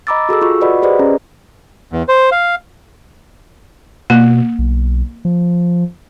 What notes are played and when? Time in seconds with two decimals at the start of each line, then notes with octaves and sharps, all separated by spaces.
0.07 D#5 A#5 B5 D6 E6 A6
0.29 F#4 G#4 A4 E6
0.42 F4 C#6
0.61 F#4 B4 D5 D#5 F#5 B5
0.82 G4 G#4 B4 C5 D5 D#5
0.99 C#4 G#4 A#5
1.93 E2
2.08 C5
2.32 F5
4.10 B2 A#3
4.59 B1
5.25 F3